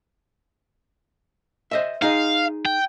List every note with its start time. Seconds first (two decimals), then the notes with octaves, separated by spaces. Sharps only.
1.71 C5 D#5 E5
2.02 D#4 G#4 D#5 F5
2.66 G5